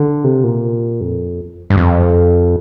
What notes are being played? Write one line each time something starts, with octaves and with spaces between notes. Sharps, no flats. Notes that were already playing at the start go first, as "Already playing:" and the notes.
Already playing: D3
C3
A#2
F2
G2
F2